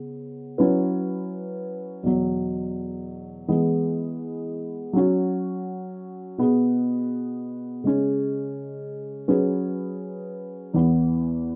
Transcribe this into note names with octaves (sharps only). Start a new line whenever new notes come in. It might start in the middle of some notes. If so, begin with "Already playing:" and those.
Already playing: C#3 B3
F#3 C#4 E4 B4
E2 B2 F#3
E3 G#3 B3 G#4
F#3 C#4 F#4
B2 B3 G#4
C#3 G#3 C#4
F#3 C#4 G#4 B4
E2 E3 B3